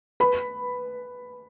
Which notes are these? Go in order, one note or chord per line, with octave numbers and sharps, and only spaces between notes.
B4 B5